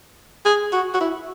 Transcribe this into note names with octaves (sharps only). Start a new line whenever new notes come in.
G#4
F#4
F#4
E4